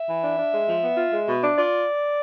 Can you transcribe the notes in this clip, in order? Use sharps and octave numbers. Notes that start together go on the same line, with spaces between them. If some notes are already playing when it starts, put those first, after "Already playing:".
Already playing: E5
E3
D4
D4
G#3
F3
B3
F4
G#3
B2
D4
F4 D5